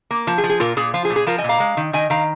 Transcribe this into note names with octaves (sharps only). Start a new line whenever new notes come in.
A#3
F3
G#4
F3
G#4
A#2 F4 A#4
A#2 G#4
F3 F4
G#4
A#2
G#4
F3 F4 A#4
D#5 G#5
A#2
F5 A#5
G#3
D#3
D#3 D#5 G#5
D#3 F5 A#5